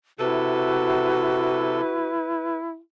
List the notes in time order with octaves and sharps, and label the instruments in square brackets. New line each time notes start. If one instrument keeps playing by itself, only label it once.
[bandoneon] C3 A4 [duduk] E4 [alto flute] F#4 [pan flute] B4